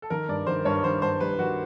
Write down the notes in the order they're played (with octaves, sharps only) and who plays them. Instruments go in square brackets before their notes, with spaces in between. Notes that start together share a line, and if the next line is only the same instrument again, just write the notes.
[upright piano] A4
[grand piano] D#3 [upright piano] A#4
[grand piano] G2 [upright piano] D5
[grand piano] D#3 [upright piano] C5
[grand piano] G2 [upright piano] C#5
[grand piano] D#3 [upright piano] C5
[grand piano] G2 [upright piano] C5
[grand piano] G3 [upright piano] B4
[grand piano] D#3 [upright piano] F#4